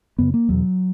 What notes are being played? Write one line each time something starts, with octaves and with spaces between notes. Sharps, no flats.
F#2 C#3 B3
A#3
E2 B2 F#3